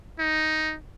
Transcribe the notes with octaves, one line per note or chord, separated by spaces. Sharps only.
D#4